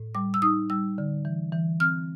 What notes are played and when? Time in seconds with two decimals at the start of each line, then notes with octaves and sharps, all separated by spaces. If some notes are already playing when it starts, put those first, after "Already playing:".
Already playing: A2
0.15 G3 D6
0.34 E6
0.42 D#4 D#6
0.70 G3 E6
0.98 D3
1.25 E3
1.53 E3
1.80 C4 F6